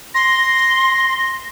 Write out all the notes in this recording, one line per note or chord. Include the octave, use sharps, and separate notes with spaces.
C6 A#6